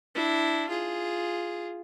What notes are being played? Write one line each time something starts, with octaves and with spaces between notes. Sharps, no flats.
D4 E4
F4 G#4